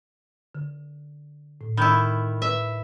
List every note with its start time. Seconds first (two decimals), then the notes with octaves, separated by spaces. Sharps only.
0.55 D3
1.61 A2
1.77 D#3 E4 B5 G6
2.42 B4 E5